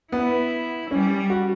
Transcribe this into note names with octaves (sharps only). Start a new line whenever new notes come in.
B3 E4
G3 C#4
F#4